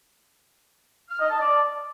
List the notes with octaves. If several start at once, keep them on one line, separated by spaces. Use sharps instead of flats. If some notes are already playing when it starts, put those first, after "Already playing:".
F6
D#5
A5
D5